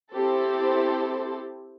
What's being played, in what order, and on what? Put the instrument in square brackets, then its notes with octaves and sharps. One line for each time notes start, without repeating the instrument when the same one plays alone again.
[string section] C4 E4 G4 A4 C5